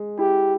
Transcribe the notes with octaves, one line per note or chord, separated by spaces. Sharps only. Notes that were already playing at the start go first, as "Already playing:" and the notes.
Already playing: G#3
E4 G4